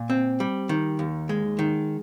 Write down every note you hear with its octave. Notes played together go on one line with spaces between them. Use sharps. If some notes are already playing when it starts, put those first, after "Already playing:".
Already playing: A#2
C4
G3
D#3
D#2
G#3
D#3